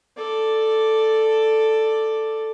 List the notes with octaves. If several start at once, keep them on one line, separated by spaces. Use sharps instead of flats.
A4 D5